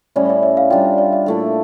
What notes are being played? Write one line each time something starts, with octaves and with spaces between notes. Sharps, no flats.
A2 G3 C#4 E4 D5
D5
E5
E5
F5
G3 D4 F4 G5
F5
D5
E5
A#2 A3 E4 A4